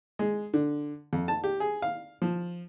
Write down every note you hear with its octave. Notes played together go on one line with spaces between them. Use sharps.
G#3
D3
F2
A5
G4
G#4
F5
F3